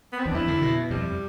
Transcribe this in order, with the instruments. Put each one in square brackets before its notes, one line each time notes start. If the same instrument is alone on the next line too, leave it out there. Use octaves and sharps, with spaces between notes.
[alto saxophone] B3
C4
[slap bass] E2 [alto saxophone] D4
[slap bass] F2 [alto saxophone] E4
[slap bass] D3
B2
[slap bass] F2 [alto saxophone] G3